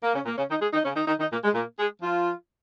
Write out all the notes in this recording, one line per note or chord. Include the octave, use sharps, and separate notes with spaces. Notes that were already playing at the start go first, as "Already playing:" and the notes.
A#3
C#3 C#4
A#2 A#3
C#3 C#4
D#3 D#4
G#3 G#4
D#3 D#4
C#3 C#4
D#3 D#4
D#3 D#4
D#3 D#4
A#2 A#3
G#3
A#2 A#3
G#3 G#4
F3 F4